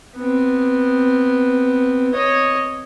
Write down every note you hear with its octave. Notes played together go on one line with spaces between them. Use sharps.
B3 C4
C#5 D#5